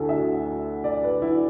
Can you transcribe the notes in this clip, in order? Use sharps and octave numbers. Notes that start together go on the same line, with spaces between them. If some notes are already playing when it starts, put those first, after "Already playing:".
Already playing: D2 D3 D4 E4 F#4 A4
E5
D5
B4
E4